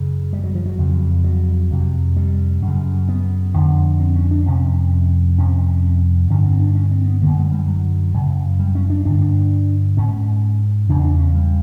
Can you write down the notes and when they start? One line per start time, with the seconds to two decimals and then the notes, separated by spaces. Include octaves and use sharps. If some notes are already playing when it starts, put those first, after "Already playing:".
Already playing: F#2 C#3
0.33 G3
0.44 F#3
0.55 F3
0.66 F#3
0.78 F2 C#3
1.24 F#3
1.71 F2 C3
2.17 G3
2.62 F#2
2.67 C#3
3.09 B3
3.55 F2 D3
4.00 C4
4.15 C#4
4.31 D4
4.46 F2 C3 C#4
5.38 F2 C3 C#4
6.30 G2 D3 C#4
6.45 C4
6.60 D4
6.75 C#4
6.91 C4
7.06 B3
7.21 F#2 D3 A#3
7.37 G#3
7.52 G3
7.67 F#3
8.14 F#2 C#3
8.60 G3
8.75 C#4
8.90 D4
9.05 G2 D3 D4
9.21 D4
9.97 G#2 C#4
10.89 E2 C#3 D4
11.05 D4
11.19 C#4
11.35 G3